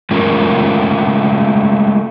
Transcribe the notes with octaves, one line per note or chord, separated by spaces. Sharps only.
G#3 A3 C#4 F4 A#4